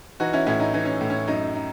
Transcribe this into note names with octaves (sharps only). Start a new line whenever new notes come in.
E3 D#4 F#4
C#4 E4
A2 C#4 E4
D#4
E3 D#4
C#4
A2
C#4
F#2 D#4
D#4